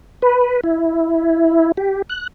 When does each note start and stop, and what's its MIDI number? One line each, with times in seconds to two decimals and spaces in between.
0.22 0.61 71
0.64 1.72 64
1.77 2.02 67
2.09 2.27 90